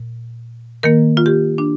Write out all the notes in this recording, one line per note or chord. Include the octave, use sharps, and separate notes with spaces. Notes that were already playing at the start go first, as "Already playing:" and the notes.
Already playing: A#2
D#3 A#3 A#4
F4
G4
D4